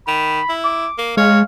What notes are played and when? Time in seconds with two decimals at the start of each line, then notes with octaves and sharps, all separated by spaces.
0.08 D#3 B5
0.49 E4
0.65 D6
0.98 A#3
1.17 G#3 C#5 F5